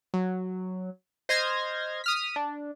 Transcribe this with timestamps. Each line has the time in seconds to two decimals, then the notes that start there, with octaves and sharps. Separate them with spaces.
0.14 F#3
1.29 C5 D#5 C6 F6 G#6 A#6
2.04 D#6 F6 B6
2.36 D4